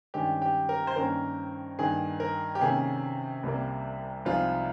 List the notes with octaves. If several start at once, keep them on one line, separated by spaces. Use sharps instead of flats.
G2 D#3 G#3 C#4 G4
G4
A#4
C5
G2 D#3 A#3 C#4 A#4
G2 D#3 A#3 D#4 G#4
A#4
G4
C3 D#3 A#3 C#4 G#4
C2 C3 G3 A#3
C2 C3 F3 G#3 D#4 F4